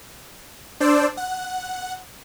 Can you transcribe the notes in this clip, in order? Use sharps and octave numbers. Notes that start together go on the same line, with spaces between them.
D4 C5 D5 E6
F#5